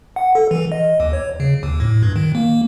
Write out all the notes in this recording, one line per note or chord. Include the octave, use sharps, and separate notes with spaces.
F#5
A4
E3
D#5
D#2
C#5
C#3
D#2
A2
G2
D#3
A#3